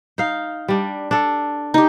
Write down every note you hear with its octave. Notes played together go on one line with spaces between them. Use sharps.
D#4 F5
G3 D4
D4 A4
D#4 G4